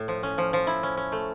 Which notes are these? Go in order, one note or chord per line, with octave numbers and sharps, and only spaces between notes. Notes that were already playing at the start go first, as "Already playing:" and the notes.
Already playing: A2
F3
C#4
F3
F3
E4
C#4
C#4
A3